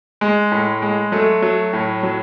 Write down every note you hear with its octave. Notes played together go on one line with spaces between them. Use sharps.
G#3
A2
G#3
F#3 A3
F#3
A2
F#3